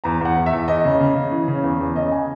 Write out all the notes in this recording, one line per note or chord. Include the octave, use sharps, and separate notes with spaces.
E2 A#5
E2 F#5
E2
E5
E2
E2 D#5
C#3
C#3
C#3
E3
C#3
E2
E2
C#3 D#5
G#5